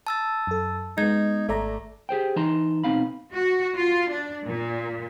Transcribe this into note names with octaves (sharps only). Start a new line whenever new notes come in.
A5 E6 A6
F#2 A4
G#3 B3 D#4 G#6
G#1 A3 D5 A#5
G4 G#4 C5 G5
E3 D#4 A5 A#5 C6
B2 A3 C4 D#4 F5 B5
F#4
F4
D4
A#2